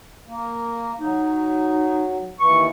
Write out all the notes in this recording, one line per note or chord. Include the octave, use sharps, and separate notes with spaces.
A#3
F#3 D#4
D#2 E3 C#6